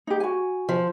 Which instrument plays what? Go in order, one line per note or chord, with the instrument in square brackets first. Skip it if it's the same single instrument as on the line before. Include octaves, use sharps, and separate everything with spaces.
[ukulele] D#4 G4
F#4 G#5
[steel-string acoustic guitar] F3